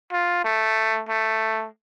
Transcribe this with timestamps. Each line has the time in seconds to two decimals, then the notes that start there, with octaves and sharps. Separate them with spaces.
0.12 F4
0.44 A3
1.09 A3